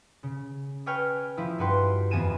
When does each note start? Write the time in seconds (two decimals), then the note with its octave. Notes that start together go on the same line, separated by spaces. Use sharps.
0.23 C#3
0.86 B4 C#5 G5 G#5 C#6 F6
1.37 F3 E4
1.58 G2 F#4 B4 G5 C6
2.11 F2 E3 B3 G#5 D#7 E7